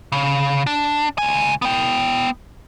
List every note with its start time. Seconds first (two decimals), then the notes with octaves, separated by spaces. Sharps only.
0.12 C#3
0.67 D4
1.18 C#2 G#5
1.62 B3 G5